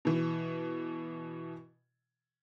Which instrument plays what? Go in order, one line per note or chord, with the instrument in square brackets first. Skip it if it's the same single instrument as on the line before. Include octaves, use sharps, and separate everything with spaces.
[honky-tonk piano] B2 E3